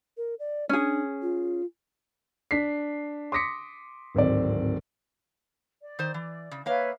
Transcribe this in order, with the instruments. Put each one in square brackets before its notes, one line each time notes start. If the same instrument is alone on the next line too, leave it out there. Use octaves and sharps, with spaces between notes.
[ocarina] A#4
D5
[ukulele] C#4 G#4 [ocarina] D4
[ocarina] F4
[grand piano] D4 B6 C7
C6 D6 D#6 A#6 B6 C#7
D1 G#1 C4 D5
[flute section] D5
[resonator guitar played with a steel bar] D#3 C5
E3
C#3
[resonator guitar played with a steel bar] A#3 F5 [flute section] B4 C#5 E5